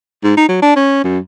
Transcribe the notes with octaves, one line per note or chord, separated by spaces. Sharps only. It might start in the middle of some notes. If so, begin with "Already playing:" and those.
G#2
D#4
F#3
D4
C#4
F#2